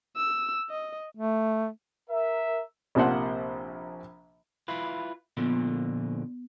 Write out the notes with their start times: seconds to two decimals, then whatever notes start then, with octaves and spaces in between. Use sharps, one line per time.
0.17 E6
0.70 D#5
1.15 A3
2.10 A#4 E5
2.95 A#1 C3 F3 A#3 C5 F#5
4.68 E4 F4 B4
5.37 A#2 D3 F3 B3